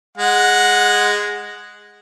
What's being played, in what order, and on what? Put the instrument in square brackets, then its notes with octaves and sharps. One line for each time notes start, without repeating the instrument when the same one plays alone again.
[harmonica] G#3 F#5